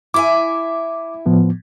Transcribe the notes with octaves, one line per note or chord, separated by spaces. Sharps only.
E4 E5 G#5 D6
A2 F3 B3